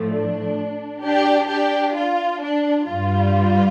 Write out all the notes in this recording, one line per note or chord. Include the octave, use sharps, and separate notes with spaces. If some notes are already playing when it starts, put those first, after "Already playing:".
Already playing: A2 F3 A3
D4
D4 G4
D4 G4
F4
D4
G2 G3 F4